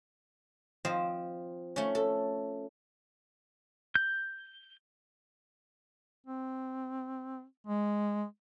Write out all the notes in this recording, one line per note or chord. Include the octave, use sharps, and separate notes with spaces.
F3 C4 D#5
A3 C#4
A4
G6
C4
G#3